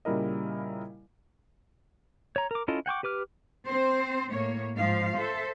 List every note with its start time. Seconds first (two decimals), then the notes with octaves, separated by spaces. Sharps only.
0.05 A#2 C#3 G3 E4 A#4 D#5
2.36 C#5 A#5
2.51 A#4 D6
2.68 C#4 E4 F4 A4 D#5
2.86 F#5 G5 C#6 D6
3.03 G4 B4 D6 F6
3.67 C4 C5
4.29 A2 A#3 C#5
4.75 G#2 F3 F5
5.16 A4 C5 E5